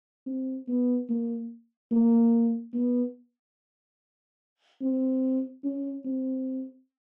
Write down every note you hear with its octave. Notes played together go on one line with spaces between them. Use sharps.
C4
B3
A#3
A#3
B3
C4
C#4
C4